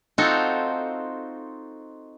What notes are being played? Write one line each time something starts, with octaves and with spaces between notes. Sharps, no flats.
C4 D#4 F4 F#4 A4